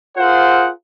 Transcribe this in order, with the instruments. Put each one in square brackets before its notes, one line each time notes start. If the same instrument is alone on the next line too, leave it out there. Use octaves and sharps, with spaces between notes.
[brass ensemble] F4 G#4 A#4 C5 F#5